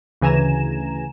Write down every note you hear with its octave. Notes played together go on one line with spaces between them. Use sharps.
D2 C#3 E3 G#5 A#5 E7